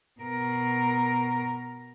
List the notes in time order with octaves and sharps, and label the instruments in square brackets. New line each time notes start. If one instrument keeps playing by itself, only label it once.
[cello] B2 A#4